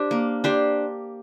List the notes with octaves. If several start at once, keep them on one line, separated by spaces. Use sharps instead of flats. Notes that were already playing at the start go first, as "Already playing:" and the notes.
Already playing: D4 G4 C5
A#3
D4 G4 C5